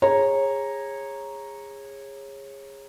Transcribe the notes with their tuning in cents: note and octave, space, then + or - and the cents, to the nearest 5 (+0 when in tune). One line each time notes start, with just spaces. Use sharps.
G#4 -25 C#5 -20 A#5 +0